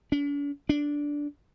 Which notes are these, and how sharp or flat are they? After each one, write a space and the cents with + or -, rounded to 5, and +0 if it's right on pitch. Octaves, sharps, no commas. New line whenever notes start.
D4 -45
D4 -10